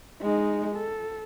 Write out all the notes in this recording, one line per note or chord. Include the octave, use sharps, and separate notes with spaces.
G#3 D#4
A4